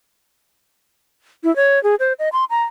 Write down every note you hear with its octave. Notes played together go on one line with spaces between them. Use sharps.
E4
C#5
G#4
C5
D#5
C6
A#5